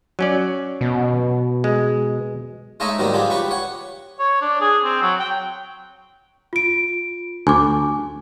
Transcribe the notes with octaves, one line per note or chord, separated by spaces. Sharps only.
F#3 C#4 D5
B2
G#3
G#3 A3 D#4 C#5 D#5 E5
G#2 D#3 F#3 G3 B3
D3 F3 G4 G#4
G4 B4 C#6
C#5 F#5
C#5
D4
G#4
C4
F#3
G5
F4 D7
D2 G#5 D6